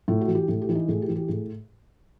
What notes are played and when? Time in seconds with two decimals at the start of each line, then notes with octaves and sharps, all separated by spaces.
0.08 A2 F4
0.21 F#4
0.28 E3
0.35 G4
0.48 A2
0.62 G4
0.69 E3
0.75 D#4
0.88 A2 G#4
1.02 G4
1.08 E3
1.16 G4
1.28 A2 G#4